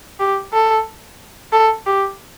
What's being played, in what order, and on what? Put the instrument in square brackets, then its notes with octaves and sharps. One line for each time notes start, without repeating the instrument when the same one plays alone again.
[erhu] G4
A4
A4
G4